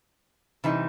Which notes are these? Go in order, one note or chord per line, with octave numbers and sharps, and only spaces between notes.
C3 E3 G3 D#4